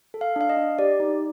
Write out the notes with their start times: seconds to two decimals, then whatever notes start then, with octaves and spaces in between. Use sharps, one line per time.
0.14 A4
0.21 F5
0.36 D4 F5
0.49 D#5
0.57 D4
0.79 G4 D5
1.00 D#4